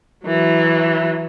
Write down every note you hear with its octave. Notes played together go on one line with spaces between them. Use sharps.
E3 F#3